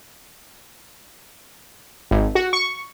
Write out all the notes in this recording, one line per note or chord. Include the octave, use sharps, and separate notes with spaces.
G#1
F#4
C#6